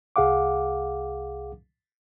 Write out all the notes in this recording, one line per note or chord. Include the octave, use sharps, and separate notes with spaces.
C2 G#4 F5 F#5 D6